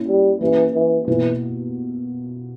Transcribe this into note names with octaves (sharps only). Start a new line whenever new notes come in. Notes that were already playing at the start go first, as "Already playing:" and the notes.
Already playing: A#3 C#4 E4
G3
E3 A#3 C#4 G4
E3
B2 E3 A#3 E4